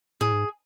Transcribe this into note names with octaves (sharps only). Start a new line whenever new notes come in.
A2 G#4
G#2